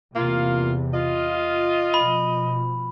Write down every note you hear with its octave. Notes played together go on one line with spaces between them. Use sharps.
E2 C3 A#3 F4
F4 D#5
B2 F3 B5